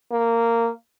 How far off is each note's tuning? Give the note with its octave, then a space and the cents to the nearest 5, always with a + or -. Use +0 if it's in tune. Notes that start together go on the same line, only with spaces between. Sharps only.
A#3 -15